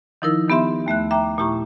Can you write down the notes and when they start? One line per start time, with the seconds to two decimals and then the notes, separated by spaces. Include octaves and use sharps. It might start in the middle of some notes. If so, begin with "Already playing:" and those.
0.22 D#3 F3 D#4 E4 A#4 E6
0.49 D#3 B3 G4 E5 C6
0.86 D#2 A3 E5 F#6
1.11 E5 G5 A#5 D6
1.38 A#2 A3 E4 G4 A#5 C#6